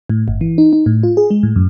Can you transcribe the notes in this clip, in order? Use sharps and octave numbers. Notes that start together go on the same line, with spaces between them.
A2
G1
E3
D#4
D#4
A2
F4
G#4
G#3
A2
F#2